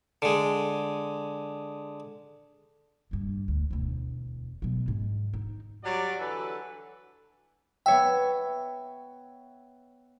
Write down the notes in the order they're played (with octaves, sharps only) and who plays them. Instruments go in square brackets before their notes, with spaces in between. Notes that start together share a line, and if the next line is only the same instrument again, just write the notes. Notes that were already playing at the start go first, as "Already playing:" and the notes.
[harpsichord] D3 G#3
[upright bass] G2 A#2
D2
E1 D2
B2 F#3
G#2
D#4
[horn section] F#3 G3 D5
D3 E3 F#3 A4 B4
[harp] B3 C#5 E5 [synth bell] G5